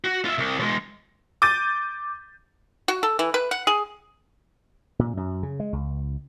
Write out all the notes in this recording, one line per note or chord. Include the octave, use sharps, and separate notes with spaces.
F#4
F4 E5
C2
B2 G#3
D6 G6 A6 D#7
F#4
A4
E3
B4
F#5
G#4
A#2
F#2
C#3
G#3
C#2